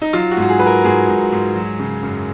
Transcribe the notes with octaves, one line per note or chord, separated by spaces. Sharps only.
D#4
F#3 F4
F#4
G#2
F#4
G#4
F#3 B4
A#4
G#2 G#4
G#2
G#2
F#3
C#3
F#2